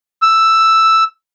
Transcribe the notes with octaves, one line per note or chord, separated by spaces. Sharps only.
E6